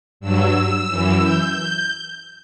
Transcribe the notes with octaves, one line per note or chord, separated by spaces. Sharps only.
G2 F#3 E6
F#2 E3
G6